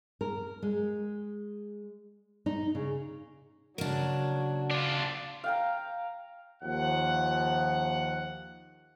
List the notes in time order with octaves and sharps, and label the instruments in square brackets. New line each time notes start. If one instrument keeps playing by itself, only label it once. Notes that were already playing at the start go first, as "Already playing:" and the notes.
[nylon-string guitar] A#4
G#3
D#4
C#3
[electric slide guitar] C#3 A#4 [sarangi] F#3 [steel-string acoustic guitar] A#3 D4
[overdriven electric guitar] D4 F4
[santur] F5 G5 A#5
[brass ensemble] D#2 F3 F#5